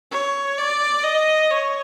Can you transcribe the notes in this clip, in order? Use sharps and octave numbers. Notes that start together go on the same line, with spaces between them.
C#5
D5
D#5
C#5